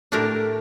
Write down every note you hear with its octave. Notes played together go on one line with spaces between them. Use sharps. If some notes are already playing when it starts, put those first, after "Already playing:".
A2 A3 D4 G4 A#4